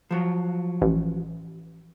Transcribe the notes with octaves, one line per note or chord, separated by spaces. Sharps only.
F3 F#3
A1